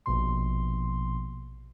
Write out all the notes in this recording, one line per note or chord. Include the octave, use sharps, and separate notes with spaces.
A#1 B2 C6